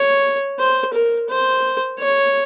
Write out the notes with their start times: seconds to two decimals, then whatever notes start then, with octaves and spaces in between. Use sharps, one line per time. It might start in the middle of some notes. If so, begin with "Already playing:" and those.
Already playing: C#5
0.59 C5
0.93 A#4
1.29 C5
1.99 C#5